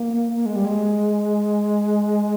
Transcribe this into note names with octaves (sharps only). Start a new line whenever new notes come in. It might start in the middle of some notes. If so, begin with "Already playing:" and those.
Already playing: A#3
A#3
G#3
G3
G#3